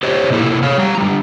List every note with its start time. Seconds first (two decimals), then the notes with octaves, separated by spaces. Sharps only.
0.03 G4 C5 C#5 D#5
0.30 C3 A#3 E4 A4
0.63 C#5 F5
0.78 G3 A#5
0.98 D3 G3